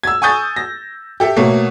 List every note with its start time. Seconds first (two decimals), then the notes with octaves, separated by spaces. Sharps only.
0.03 E6 G#6
0.22 G#5 C#6 D#6 G6 A6
0.56 A#6
1.20 G4 A4 E5
1.36 B2 F#3 A3 A#3